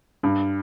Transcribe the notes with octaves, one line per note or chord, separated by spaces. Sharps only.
G2